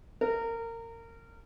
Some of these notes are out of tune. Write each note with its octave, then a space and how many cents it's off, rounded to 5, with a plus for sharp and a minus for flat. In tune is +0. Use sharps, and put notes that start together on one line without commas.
A#4 -25